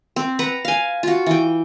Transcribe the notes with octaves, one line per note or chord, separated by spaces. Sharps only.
C4
B4 F#5 A#5
F5 G#5
F4 F#4
E3 G5